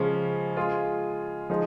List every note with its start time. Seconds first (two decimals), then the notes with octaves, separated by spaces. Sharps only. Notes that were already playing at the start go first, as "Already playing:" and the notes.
Already playing: C#3 F3 G#3 C#4
0.57 G#3 F4 G#4
1.50 F3 G#3 D#4